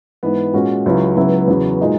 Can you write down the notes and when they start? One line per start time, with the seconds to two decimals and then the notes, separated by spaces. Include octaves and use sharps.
0.23 G#2 E3 B3
0.53 A#2 G#3 C#4 F#4
0.85 C#2 C#3 F#3 C#4 E4
1.17 C#2 C#3 F#3 B3 E4
1.48 E2 C#3 F#3 B3
1.80 A#2 G#3 D#4 F#4